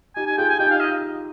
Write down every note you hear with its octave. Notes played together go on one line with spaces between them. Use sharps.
D#4 G4 G#5
G#5
F4 G#4 G5
G#5
D#4 G4 G5
F5
D#5